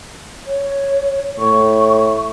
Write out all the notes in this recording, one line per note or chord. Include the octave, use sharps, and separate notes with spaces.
C#5
A2 C#6